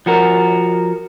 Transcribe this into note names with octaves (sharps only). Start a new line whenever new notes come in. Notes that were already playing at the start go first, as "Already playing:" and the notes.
F3 F#4 A#4